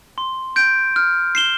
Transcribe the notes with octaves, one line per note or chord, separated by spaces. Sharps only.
C6
G6 D7
F6
C7 E7 G7